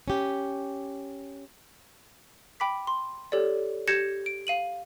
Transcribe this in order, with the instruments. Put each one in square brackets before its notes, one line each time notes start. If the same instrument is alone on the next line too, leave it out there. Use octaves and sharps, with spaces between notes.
[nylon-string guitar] C#4 G4
[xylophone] G5 B5 D6 B6
C6
G4 A4 C#5 D5
G4 G6 G#6 A#6 C#7 E7
D7
F5 D#7 F#7